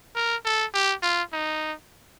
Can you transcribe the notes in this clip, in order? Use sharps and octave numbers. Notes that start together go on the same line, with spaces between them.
A#4
A4
G4
F4
D#4